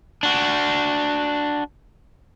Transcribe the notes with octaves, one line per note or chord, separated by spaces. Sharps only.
D4 F#4